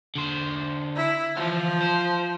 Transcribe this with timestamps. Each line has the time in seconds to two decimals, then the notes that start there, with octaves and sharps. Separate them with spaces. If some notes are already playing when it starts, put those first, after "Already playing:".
0.16 D3 C5
0.96 E4
1.37 E3 F3 F4
1.81 C5